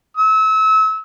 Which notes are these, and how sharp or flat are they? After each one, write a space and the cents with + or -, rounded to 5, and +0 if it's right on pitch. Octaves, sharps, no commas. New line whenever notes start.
E6 -30